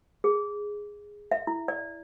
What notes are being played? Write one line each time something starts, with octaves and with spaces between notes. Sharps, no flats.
G#4
E5
E4
D5